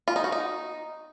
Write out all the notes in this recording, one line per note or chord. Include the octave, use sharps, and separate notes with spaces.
F4
D#4
F#4
D#4